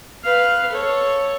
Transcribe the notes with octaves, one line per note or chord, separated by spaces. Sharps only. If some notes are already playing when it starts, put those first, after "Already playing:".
B4 F5
A4 C#5